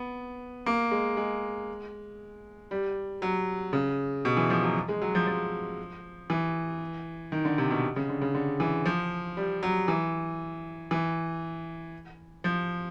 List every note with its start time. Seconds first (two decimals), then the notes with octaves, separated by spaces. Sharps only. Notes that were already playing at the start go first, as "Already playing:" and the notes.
Already playing: B3
0.66 A#3
0.91 G#3
1.17 G#3
2.71 G3
3.22 F#3
3.73 C#3
4.25 B2
4.37 E3
4.50 F3
4.63 F#3
4.89 G#3
5.02 F#3
5.15 F3
5.27 F3
6.30 E3
7.32 D#3
7.45 D3
7.58 C3
7.71 B2
7.96 C#3
8.09 D3
8.22 C#3
8.35 D3
8.60 E3
8.85 F3
9.37 G3
9.63 F#3
9.88 E3
10.91 E3
12.44 F3